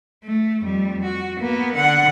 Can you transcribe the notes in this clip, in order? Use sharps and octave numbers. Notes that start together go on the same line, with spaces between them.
A3
F2 G3
F#4
A#3 B3
D3 F#5